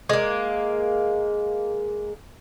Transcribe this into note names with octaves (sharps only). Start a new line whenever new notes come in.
G#3 A#3